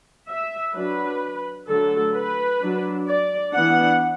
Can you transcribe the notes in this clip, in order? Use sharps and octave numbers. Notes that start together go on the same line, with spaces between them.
E5
F#3 D4 B4
D3 F#3 A3 A4
B4
F#3 D4
D5
E3 B3 D4 F#5